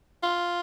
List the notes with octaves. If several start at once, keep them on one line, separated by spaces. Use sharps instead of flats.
F4